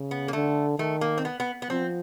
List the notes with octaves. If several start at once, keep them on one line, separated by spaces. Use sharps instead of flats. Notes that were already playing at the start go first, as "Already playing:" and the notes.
Already playing: C#3
B3
A#3
D3 A3
D#3 A3
A#3
C4
B3
B3
B3
F3 C4